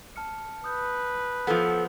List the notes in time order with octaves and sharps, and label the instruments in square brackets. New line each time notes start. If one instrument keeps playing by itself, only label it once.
[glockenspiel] A5 F6 C#7
[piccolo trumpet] B4 [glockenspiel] D#6 G6
[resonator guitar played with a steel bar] F3 B3 [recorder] A4